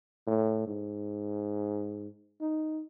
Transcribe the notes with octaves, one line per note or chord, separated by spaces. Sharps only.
A2
G#2
D#4